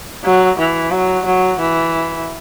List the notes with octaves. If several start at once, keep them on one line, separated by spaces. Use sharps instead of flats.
F#3
E3
F#3
F#3
E3